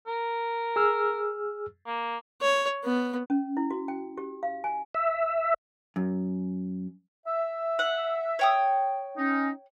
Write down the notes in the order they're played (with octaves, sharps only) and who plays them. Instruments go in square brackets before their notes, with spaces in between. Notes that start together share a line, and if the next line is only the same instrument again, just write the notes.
[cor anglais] A#4
[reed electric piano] G#4 E6 F6
[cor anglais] A#3
[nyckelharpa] C#5
B3
[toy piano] C#4
E4
F#4
G5
G4
F5
G#5
[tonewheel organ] E5
[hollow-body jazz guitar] F#2
[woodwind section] E5
[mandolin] F#5
C#5 G5 D#6
[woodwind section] C#4 D#4